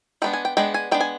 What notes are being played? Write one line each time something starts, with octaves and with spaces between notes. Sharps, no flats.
G#3 B3 D4 G5
G#5
G5
G#3 B3 D4 G5
G#5
G#3 B3 D4 G5
G#5